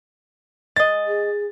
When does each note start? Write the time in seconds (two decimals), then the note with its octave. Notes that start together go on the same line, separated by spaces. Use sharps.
0.76 G#3 D#5 A6
1.07 G#4